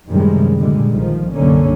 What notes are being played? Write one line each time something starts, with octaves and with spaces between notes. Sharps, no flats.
F#2 A2 C3 D#3 G3 G#3
A#2 D3 G3 G#3
A#1 D#3 F3
C2 F#2 D3 A#3 C#4